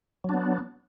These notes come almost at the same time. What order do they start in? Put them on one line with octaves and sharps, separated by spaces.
F#3 D4 B3